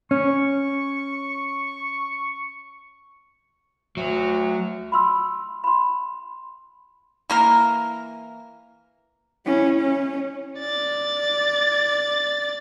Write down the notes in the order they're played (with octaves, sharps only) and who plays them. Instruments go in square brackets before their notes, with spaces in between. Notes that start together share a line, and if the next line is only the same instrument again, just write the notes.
[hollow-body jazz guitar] C#4 [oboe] C#6
[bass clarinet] D2 [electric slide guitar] F#3
[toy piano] B5 C6 E6
B5 C6
[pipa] E3 A#3 A#4
[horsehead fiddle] C#4 E4
C#4
[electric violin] D5 A6